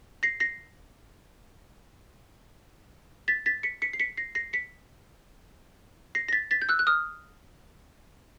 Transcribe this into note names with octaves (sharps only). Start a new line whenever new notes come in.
A#6 C7
A#6 C7
A6 B6
A6 B6
B6 C#7
B6 C#7
C7
B6 C#7
A#6 C7
A#6 C7
B6 C#7
A#6 C7
A#6
A6 B6
A6 B6
G6
E6 F#6
F#6
D#6 F6